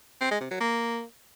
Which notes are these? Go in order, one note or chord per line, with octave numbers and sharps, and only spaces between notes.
C4
G#3
C3
F#3
A#3